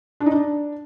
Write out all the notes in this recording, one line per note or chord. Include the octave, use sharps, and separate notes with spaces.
D4
D#4
D4